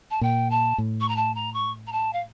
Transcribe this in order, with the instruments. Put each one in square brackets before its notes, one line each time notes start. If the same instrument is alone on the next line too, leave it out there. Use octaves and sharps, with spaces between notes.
[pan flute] A5
[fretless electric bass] A#2 [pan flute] G5
[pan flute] A5
[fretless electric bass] A2
[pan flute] C#6
A#5
A5
A#5
C#6
A#5
A5
F5